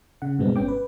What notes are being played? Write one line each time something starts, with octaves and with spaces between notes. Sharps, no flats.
C#3 F#5
G2 B2 G#3 B3 C4
G1 G2 B3 C#4 G5 D6
B4